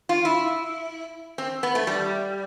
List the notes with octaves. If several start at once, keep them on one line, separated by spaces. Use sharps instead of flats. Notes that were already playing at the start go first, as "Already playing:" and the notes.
F4
E4
C4
B3
A3
G3